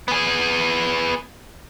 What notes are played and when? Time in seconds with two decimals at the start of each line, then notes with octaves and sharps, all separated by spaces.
0.08 B3 G#4